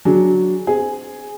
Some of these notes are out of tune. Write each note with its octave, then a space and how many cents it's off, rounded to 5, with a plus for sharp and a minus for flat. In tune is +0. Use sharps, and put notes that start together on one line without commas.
F#3 +0 D4 +0 G#4 +0
C4 -25 G#4 +0